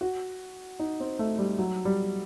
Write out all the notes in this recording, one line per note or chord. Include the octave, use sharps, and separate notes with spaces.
F#4
D#4
C4
A3
G3
F#3
G3